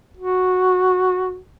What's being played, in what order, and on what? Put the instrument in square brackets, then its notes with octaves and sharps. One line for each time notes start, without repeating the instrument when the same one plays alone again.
[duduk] F#4